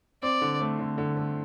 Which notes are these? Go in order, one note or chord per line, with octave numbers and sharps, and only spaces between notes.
C4 D5
D3
A3
D3
D3
A3